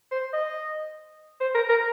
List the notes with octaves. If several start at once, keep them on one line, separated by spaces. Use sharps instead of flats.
C5
D#5
C5
A#4
A#4